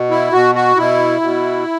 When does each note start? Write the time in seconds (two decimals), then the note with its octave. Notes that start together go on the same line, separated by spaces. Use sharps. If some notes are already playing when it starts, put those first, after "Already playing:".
Already playing: B2
0.11 E4
0.33 B2 F#4
0.55 F#4
0.77 B2 E4
1.21 B2